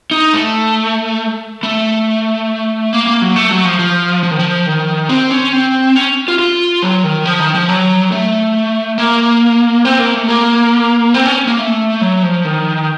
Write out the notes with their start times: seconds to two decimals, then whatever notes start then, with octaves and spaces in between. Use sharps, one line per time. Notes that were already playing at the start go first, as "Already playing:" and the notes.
0.11 D#4
0.34 A3
1.63 A3
2.93 A#3
3.07 A#3
3.22 F#3
3.36 A3
3.50 F#3
3.65 F3
3.79 F3
4.23 F3
4.31 D#3
4.39 F3
4.66 D#3
5.09 C4
5.31 C#4
5.52 C4
5.95 C#4
6.28 F4
6.39 F4
6.82 F#3
7.04 D#3
7.25 F3
7.40 D#3
7.54 F3
7.69 F#3
8.12 A3
8.98 A#3
9.85 C4
9.99 A#3
10.14 A3
10.28 A#3
11.14 C4
11.26 C#4
11.47 A#3
11.58 A3
12.01 F#3
12.23 F3
12.45 D#3